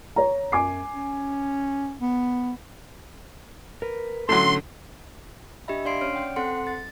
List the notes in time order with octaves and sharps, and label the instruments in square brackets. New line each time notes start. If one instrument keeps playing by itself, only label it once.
[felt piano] C#5 A#5
[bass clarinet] F#2 [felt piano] G#5 D6 C7
[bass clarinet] C#4
B3
[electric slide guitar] A#4 B4
[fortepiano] A2 F#3 [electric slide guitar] D3 C#4 A4 [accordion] C6
[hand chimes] D4 G4 D#5 E5 B5
D4 D5 F5 C6 C7 D7
C#4 C#5 D5 F6 D7
F#5 G5
C4 A4 F#5 C6 C#7
A6